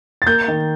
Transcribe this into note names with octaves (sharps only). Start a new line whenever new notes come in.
A6
A#3 G6
D#3